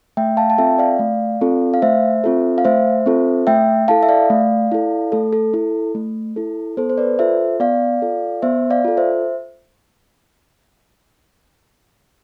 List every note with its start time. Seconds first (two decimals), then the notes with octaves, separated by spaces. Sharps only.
0.17 A3 E5 G5
0.37 F5 A5
0.50 A5
0.58 C4 F4 A4 E5 G5
0.78 D5 F5
0.99 A3
1.41 C4 F4 A4
1.74 F5
1.82 A3 C5 E5
2.24 C4 F4 A4
2.58 F5
2.65 A3 C5 E5
3.06 C4 F4 A4
3.47 A3 E5 G5
3.88 E4 A4 F5 A5
4.03 E5
4.09 D5 F5
4.30 A3
4.72 E4 A4
5.12 A3 A4
5.33 A4
5.53 E4 A4
5.95 A3
6.36 E4 A4
6.77 B3 A4 C5
6.90 C5
6.98 B4 D5
7.19 F4 A4 C5 E5
7.60 B3 D5 F5
8.02 F4 A4
8.42 B3 C5 E5
8.70 D5 F5
8.84 F4 A4
8.97 C5 E5